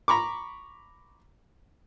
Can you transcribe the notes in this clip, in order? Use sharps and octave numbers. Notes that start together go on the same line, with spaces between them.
A#5 B5 C#6 D6